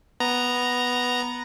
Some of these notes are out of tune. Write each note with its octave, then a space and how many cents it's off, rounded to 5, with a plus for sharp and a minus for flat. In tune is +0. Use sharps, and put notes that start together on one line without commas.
B3 +0 A#5 +0